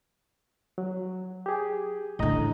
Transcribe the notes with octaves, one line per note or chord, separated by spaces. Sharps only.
F#3
G4 G#4
A1 A2 D3 D#5 A#5